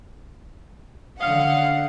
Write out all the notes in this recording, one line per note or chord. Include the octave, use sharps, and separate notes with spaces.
D3 C#4 D#5 F5 F#5